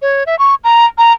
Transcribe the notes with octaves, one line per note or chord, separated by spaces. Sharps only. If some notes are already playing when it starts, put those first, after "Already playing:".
C#5
E5
C#6
A#5
A#5